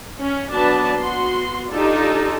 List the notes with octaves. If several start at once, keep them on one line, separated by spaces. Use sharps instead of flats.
C#4
F#3 B3 D4 B4 A5
B3 F#4 C6
D4 D#4 F4 G4 A4